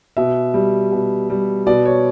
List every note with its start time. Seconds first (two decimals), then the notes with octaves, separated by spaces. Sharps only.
0.17 B2 E5
0.54 G3
0.92 B2
1.30 G3
1.67 B2 D5
1.85 C#5